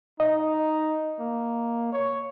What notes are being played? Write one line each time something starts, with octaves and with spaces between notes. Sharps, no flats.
D#4 D#5
A#3
C#5